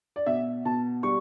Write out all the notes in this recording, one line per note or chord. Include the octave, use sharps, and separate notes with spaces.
D5
B2 E5
B2 A5
G3 C#6